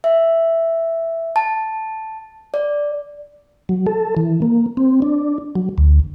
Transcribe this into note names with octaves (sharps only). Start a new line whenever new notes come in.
E5
A5
D5
F#3
A4
E3
A#3
C4
D4
F#3
D2